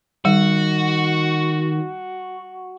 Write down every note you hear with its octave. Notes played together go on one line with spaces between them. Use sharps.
D#3 G3 F#4